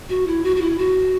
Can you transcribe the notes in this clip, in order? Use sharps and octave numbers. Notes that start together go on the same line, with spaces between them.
F#4
E4
F#4
F#4
E4
F#4